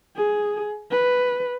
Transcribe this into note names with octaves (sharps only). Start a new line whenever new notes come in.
G#4
B4